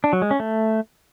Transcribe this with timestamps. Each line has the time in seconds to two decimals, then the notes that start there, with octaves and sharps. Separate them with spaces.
0.04 D4
0.13 F#3
0.22 G#3
0.31 C#4
0.40 A3